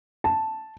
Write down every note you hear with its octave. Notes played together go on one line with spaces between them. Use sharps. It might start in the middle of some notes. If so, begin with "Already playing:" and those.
A5